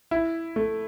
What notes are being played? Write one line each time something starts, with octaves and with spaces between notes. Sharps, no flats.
E4
A3